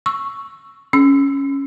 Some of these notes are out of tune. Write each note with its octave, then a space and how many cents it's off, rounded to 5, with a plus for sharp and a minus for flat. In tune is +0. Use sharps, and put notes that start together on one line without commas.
C#6 +0 E6 +0
C#4 +0 E6 +0